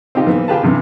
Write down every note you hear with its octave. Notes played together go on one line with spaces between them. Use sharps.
C4 D#4 F4 G4
E3 A#3 B3
F4 G4 G#4 B4 F5 A5
G2 C3 E3